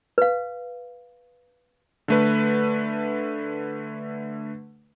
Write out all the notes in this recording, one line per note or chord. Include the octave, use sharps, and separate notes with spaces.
B4 F5
D3 A3 B4